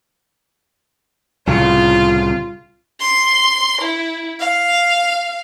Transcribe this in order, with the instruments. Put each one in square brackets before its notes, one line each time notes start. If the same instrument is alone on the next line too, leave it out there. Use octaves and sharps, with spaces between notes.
[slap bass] C2 A2 C#3 [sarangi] F4
[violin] C6
E4
F5